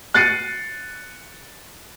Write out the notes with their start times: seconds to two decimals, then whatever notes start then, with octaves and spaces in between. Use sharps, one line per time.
0.14 F#6 A6 C7 C#7 D#7